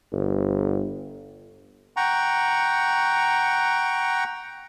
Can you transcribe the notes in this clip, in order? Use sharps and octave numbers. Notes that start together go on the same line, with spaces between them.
G1
F#5 G5 A#5 C#6